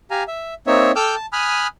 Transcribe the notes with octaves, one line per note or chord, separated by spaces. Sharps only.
G4 F5 G#5 A#5
E5
A#3 C4 D#4 C#5 E5
A4 G5 D6 E6 F6 G6
A5
G#5 B5 D#6 F6 F#6